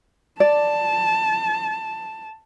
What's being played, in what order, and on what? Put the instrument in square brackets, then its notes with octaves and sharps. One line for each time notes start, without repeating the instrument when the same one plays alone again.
[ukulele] D5 [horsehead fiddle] A5